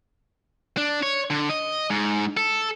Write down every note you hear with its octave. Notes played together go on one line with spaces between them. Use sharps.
D4
C#5
D3
D#5
G#2
A4